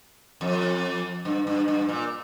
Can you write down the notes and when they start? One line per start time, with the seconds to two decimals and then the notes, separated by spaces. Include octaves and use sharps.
0.41 F2
1.25 G2
1.47 G2
1.68 G2
1.89 A#2